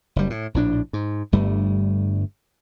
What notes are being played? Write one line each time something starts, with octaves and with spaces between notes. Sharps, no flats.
F#1 G3
A2
A#1 A2 D4
G#2
G1 G2 G3 A3